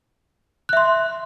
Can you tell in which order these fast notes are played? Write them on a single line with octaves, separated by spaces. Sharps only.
F#6 E5 C6